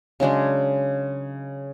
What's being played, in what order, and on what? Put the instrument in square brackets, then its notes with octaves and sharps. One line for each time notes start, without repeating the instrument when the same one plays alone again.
[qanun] C#3 F#3 G#3 D4